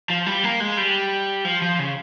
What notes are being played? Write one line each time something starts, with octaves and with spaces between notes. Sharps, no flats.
F3
G3
A#3
G#3
G3
F3
F3
C#3